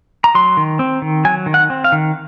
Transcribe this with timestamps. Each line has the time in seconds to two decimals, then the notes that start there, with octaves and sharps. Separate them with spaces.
0.24 A#5
0.35 F#3 C6
0.57 D#3
0.79 C4
1.02 D#3
1.25 F#3 G#5
1.46 D#3
1.54 F#5
1.70 C4
1.84 F5
1.92 D#3